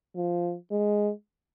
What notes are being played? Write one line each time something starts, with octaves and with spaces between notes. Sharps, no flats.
F3
G#3